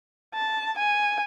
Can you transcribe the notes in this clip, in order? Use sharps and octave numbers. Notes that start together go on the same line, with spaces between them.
A5
G#5